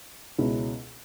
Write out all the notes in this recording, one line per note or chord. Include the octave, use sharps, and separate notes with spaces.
C#2 B2 G#3 C#4 E4